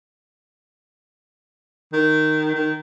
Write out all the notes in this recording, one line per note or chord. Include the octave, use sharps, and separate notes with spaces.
D#3
D#3